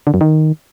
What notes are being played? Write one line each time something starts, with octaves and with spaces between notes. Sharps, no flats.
D3
F#2
D#3